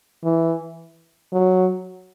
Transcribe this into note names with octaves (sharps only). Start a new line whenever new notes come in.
E3
F#3